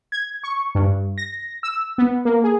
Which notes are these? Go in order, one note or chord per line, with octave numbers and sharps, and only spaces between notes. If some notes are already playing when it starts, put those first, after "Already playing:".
G#6
C#6
G2
A#6
E6
B3
A#3
G#4